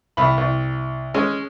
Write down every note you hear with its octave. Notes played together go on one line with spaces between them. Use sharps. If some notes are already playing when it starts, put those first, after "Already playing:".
C2 B5
C2
G#3 C#4